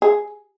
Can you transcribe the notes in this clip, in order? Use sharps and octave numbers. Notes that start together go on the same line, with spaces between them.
G#4